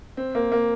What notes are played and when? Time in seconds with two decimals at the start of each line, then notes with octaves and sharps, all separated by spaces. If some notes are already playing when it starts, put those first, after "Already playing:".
0.17 C4
0.35 A#3
0.52 A#3